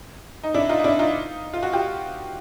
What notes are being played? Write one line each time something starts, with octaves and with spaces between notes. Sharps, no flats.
D#4
D4 E4
D#4 F4
D#4
D4 E4
D#4 F4
F4
F#4
F4 G4